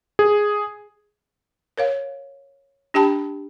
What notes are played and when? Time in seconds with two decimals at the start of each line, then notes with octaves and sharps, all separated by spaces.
0.19 G#4
1.78 A#4 C#5 F5
2.94 D4 G4 G5 A5 B5